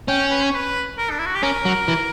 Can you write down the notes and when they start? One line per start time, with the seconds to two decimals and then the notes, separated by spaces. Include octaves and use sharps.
0.08 C#4 G5
0.31 B4
0.43 C#5
0.55 B4
0.98 A#4
1.11 D4
1.19 E4
1.26 F#4
1.35 G4
1.43 C#4 A#4
1.65 F#3
1.88 E3